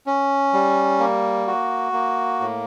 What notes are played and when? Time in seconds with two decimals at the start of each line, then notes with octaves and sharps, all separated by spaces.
0.07 C#4
0.54 G3
0.99 A#3
1.47 F#4
1.93 A#3
2.40 A2